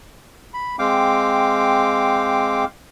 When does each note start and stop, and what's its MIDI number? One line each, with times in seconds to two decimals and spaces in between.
0.53 0.76 83
0.79 2.65 56
0.79 2.65 60
0.79 2.65 77
0.79 2.65 79
0.79 2.65 86